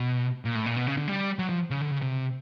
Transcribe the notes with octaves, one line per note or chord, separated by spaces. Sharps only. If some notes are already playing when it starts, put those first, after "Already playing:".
Already playing: B2
A#2
A2
A#2
B2
C#3
D3
G3
F#3
F3
C#3
D3
C#3
C3